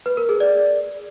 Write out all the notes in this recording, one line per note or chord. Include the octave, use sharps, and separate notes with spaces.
B4
A#4
G#4
D5